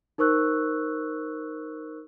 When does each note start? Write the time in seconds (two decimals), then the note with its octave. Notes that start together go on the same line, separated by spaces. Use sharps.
0.18 D#4 A#4 C5 C#6 E6 F#6